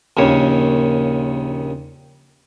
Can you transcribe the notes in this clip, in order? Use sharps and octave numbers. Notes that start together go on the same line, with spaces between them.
A#1 D#2 C#3 C#5